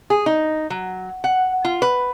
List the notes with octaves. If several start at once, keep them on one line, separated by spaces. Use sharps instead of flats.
G#4
D#4
F#3
F#5
F4
B4